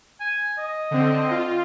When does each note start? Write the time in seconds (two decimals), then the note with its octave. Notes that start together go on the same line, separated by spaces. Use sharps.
0.20 G#5
0.58 D#5
0.91 D3 C4
1.31 F4